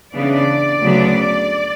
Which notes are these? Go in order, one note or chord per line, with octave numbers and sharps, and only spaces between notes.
C#3 E3 B3 D4 D5
D2 C#3 F#3 B3 D4